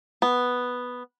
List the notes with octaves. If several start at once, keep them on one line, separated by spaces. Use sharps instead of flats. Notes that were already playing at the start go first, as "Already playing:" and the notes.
B3